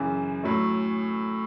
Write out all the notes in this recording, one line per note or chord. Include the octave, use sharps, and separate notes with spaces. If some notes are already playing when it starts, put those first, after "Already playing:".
Already playing: F#2 C#3 E3
A2 F#3 A3